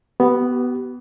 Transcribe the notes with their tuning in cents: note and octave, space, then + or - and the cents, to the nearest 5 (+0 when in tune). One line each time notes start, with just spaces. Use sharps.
B3 +0 G4 -40